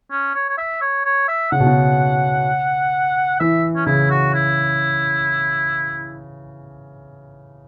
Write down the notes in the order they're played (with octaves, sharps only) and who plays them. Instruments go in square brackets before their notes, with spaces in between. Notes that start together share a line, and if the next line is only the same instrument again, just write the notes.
[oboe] C#4
C#5
C#5
E5
C#5
C#5
E5
[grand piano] C#3 [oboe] F#5
[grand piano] B2
C#3
[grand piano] E3 [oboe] E5
[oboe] C#4
[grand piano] C#3 [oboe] E4
[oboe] F#4
E4